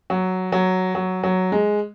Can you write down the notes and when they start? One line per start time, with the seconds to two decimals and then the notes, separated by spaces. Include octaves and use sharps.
0.10 F#3
0.52 F#3
0.95 F#3
1.23 F#3
1.52 G#3